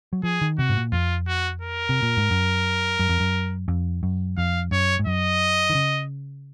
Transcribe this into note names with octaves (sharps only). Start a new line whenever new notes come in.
F#3
F3 G#4
D#3
C3 F#4
G#2
A#2
F2 F4
F#4
A#4
C3
A#2
G#2
F#2
F#2
F2
F#2
F2
F#2
F2 F5
F#2 C#5
G#2
F#2 D#5
D#3
C#3